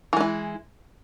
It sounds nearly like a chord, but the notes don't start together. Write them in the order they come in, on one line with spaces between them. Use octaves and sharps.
E3 G#3 E4